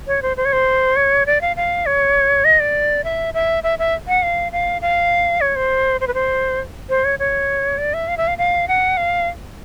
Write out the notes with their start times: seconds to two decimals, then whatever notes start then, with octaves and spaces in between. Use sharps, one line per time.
0.07 C#5
0.22 C5
0.37 C5
0.45 C#5
0.53 C5
0.96 C#5
1.26 D5
1.41 F5
1.56 F5
1.86 C#5
2.44 D#5
2.60 D5
3.04 E5
3.34 E5
3.63 E5
3.79 E5
4.08 F#5
4.23 F5
4.52 F5
4.82 F5
5.41 C#5
5.56 C5
6.01 C5
6.08 B4
6.14 C5
6.89 C5
7.05 C#5
7.19 C#5
7.78 D5
7.94 E5
8.08 F5
8.17 E5
8.27 F5
8.38 F5
8.68 F#5
8.97 F5